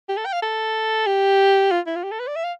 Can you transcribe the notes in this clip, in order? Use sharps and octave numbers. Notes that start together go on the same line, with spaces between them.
G4
A4
G5
F5
A4
G4
F4
E4
F4
G4
A4
B4
D5
E5
F5